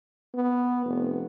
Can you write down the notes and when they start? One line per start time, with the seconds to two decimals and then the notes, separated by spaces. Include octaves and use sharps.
0.34 B3
0.85 F1